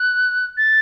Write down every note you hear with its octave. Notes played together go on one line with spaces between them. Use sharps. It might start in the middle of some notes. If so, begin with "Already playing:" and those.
Already playing: F#6
A6